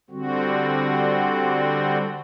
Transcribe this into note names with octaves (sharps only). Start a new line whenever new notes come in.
D3 G3 C4 F#4